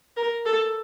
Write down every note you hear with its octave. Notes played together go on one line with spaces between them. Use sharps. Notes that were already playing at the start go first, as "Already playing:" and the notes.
A#4
A4